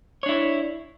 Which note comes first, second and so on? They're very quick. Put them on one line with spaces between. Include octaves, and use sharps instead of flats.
C#5 D4 E4